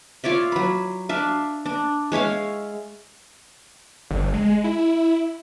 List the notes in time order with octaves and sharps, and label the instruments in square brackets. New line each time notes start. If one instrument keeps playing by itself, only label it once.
[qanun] F4 C#5 D5 E5
F#3 B5
D4 E5 F5
D4
G#3 C#5 E5 F5
[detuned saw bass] G1
G#3
E4